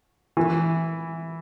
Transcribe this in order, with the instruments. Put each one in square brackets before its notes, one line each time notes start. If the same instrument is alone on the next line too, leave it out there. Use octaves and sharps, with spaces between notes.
[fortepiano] E3